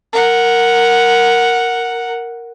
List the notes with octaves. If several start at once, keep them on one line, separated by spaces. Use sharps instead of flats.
A#4 F#5